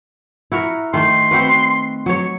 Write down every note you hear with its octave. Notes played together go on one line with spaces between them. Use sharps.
E4 F#4 A#4
D#3 A3 C6
C4 F#4 B4
F#3 C#5